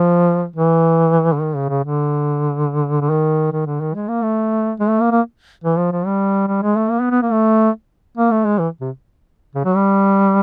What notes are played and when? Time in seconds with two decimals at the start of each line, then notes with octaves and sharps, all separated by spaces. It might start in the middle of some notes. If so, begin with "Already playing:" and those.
Already playing: F3
0.56 E3
1.33 D3
1.41 D#3
1.56 C#3
1.69 C#3
1.84 D3
3.01 D3
3.10 D#3
3.52 D#3
3.66 D3
3.81 D#3
3.95 G#3
4.08 A#3
4.22 A3
4.79 G#3
4.89 A3
5.00 A#3
5.11 A#3
5.64 E3
5.77 F3
5.92 F3
6.06 G3
6.48 G3
6.62 G#3
6.76 A3
6.90 A#3
7.00 B3
7.11 B3
7.22 A#3
7.32 A3
8.17 A#3
8.31 A3
8.45 G#3
8.59 E3
8.81 C3
9.55 C#3
9.65 F#3
9.75 G3